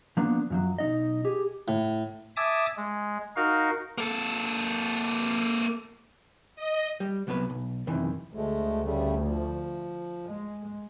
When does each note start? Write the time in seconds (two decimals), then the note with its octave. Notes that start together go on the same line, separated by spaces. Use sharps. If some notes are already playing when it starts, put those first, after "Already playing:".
0.17 F3 A#3 B3 D4
0.50 F#2 F3 F#3
0.79 B1 D#4 D#5
1.25 G4 G#4
1.68 A2
2.37 E5 G#5 A5 D6 D#6
2.77 G#3
3.36 D#4 F#4 A#4 F5
3.98 A#3 A4
6.56 D#5
7.00 G3
7.27 C2 F#3 B3 F4 B4
7.50 B1
7.87 F#2 C3 D#3 E3
8.34 D2 G#3 A3
8.82 C#3 G3 A3
9.26 F3
10.28 G#3